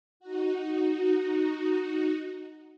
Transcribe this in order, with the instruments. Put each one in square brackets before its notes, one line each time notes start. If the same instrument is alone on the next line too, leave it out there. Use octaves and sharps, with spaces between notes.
[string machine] D#4 F#4